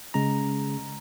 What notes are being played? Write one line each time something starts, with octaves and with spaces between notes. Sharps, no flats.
C#3 G#3 C#4 A#5